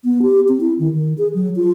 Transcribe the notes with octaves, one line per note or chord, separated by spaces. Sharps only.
B3
G4
C4
E4
D#3
D#3
G#4
F#3
F4